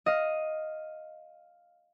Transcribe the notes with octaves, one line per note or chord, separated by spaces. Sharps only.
D#5 F5